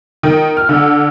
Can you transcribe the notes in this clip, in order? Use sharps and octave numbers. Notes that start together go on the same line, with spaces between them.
D#3
F6
D3